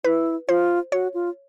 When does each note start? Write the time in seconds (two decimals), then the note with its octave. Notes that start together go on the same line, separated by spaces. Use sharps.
0.04 E4 B4
0.48 F4 C5
0.92 F#4 C#5
1.14 F4